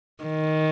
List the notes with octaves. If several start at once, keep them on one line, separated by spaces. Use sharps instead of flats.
D#3